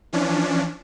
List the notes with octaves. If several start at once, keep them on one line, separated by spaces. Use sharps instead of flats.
E3 F3 C#4 D4